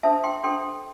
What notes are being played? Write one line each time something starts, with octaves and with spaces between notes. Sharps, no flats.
D4 A4 C5 E5 A5
G5 C6
D4 A4 C5 G5 C6